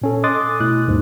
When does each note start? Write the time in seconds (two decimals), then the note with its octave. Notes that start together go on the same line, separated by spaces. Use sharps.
0.02 A#2 C#4 A4
0.24 D#5 C6 D6 D#6 F#6 A6
0.60 B2 A3 E4 F#6
0.88 D#2 G#2